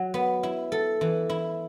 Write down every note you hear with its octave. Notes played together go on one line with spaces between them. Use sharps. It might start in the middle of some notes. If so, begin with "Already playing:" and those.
Already playing: F#3
B3
E4
A4
E3
E4